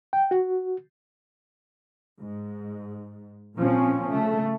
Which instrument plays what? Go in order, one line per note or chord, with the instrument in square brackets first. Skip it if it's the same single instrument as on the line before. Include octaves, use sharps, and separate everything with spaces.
[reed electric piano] G5
F#4
[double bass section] G#2
A#2 F3 C4 C#4
C#3 A3